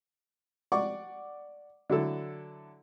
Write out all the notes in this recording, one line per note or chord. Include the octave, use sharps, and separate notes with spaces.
D5 F#5 C#6 D6
D3 F#3 E4 A4